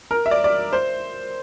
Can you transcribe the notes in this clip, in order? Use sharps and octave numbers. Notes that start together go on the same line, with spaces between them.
A#4
E5
D5
D5
C5